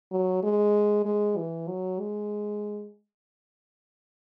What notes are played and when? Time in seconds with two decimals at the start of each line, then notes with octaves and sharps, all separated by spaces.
0.12 F#3
0.43 G#3
1.05 G#3
1.37 E3
1.68 F#3
2.00 G#3